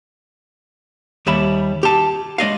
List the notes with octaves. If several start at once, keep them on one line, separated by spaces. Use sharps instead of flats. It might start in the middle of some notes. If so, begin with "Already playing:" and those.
D#2 G3 E5 B5
G4 A5
G#3 D5 D#5 F5